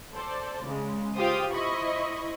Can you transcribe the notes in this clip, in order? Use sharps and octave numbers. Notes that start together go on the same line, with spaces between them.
A4 C5 D5 A5
C#3 G#3
F4 G4 C5 F5 G5 D#6
E4 C5 D#5 B5 C#6